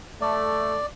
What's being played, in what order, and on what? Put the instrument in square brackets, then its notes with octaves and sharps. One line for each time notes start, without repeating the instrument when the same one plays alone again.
[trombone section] A3 [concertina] D5